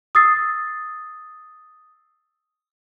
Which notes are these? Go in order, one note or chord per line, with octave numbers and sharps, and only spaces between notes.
D#6 E6 A6 C7